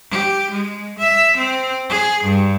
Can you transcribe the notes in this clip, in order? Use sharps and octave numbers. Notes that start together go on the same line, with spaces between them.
G4
G#3
E5
C4
G#4
G2